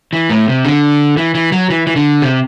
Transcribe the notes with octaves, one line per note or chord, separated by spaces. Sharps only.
E3
A2
C3
D3
E3
E3
F#3
E3
E3
D3
C3